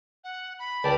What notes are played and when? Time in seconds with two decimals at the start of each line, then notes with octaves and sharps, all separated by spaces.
0.24 F#5
0.59 B5
0.84 C#2 D5 G5 A5